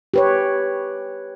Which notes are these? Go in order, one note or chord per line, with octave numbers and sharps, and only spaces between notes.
G4 B4 C#5